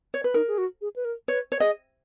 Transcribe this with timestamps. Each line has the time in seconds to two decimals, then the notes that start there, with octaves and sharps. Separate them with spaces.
0.14 C#5
0.24 B4
0.34 D#4 A#4
0.48 G#4
0.58 F#4
0.81 G#4
0.96 B4
1.05 A#4
1.28 B4 C#5
1.52 C#5
1.60 G#4 D#5